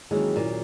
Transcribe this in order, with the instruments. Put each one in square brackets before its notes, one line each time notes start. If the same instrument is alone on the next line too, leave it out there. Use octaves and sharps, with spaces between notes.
[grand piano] D#2 D#3 F#3 C#4 G#4 [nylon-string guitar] E3 G#3
[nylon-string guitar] A#2